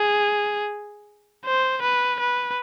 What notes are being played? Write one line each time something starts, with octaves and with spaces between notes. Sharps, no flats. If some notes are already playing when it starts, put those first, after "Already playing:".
Already playing: G#4
C5
B4
B4